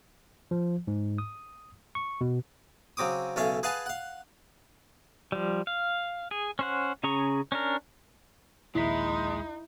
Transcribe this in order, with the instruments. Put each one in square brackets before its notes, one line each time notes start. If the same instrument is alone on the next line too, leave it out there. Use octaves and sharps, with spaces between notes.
[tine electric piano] F3
G#2
D#6
C#6
B2
[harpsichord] C#3 F#3 C4 D6 D#6
B1 C#3 C#4 A4 E5 F5
G#4 B4 F5 F#5 G#5 A5
F5 F#5
[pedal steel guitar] F3 G3
F5
G#4
C#4 C5 F#5
C#3 C#4 G#4 A#5 C#6
C#4 D4 A#4
[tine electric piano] A#1 D#2 B6 [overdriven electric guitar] G#3 [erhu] D#4 [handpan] E4